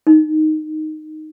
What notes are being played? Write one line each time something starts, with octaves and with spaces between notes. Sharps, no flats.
D#4